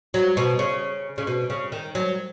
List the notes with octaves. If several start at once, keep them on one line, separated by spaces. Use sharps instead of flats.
F#3
B2
C#3
C#3
B2
C#3
D#3
F#3